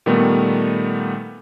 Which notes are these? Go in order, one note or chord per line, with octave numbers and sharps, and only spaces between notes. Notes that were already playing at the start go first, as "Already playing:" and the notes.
A#2 D#3 G3 A3 B3